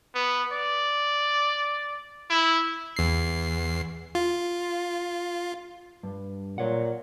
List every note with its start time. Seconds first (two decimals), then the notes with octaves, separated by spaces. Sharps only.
0.15 B3
0.52 D5
2.30 E4
2.96 E2 C7
4.15 F4
6.03 G2
6.58 A#2 C#5 F#5